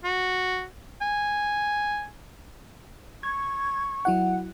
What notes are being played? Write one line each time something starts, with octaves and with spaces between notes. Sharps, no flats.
F#4
G#5
C#6 G#6
F#3 E4 F#5